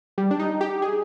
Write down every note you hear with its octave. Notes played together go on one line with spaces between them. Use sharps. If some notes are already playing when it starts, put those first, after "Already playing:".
G3
D4
D#4
G4
G#4